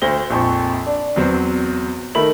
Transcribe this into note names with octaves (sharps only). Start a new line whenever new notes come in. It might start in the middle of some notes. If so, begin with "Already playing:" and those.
D2 C5 A#6 G7
A#1 F2 C#6
D4
E2 F#3 C4
D#3 A3 E5 B5 F#7